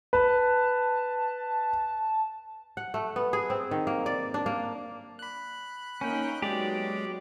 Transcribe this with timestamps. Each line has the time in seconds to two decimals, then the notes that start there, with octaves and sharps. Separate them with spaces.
0.13 B4 A5
2.77 F#5
2.94 A3
3.16 B3
3.33 G#4
3.50 C4
3.71 D#3
3.87 A#3
4.06 D5
4.34 D4
4.46 A#3
5.19 B5 F#6
6.01 A#3 C#4 D#4 G5
6.42 F#3 G#3 B3 G4 D5